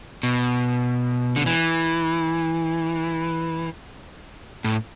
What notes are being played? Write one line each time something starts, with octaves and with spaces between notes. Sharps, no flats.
B2
D3
E3
A2